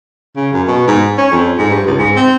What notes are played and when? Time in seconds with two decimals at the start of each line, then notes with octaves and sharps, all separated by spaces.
0.36 C#3
0.53 F#2
0.68 B2
0.87 G#2
1.18 C#4
1.32 F2
1.58 G#2
1.70 G2
1.87 C#2
1.99 G#2
2.16 C4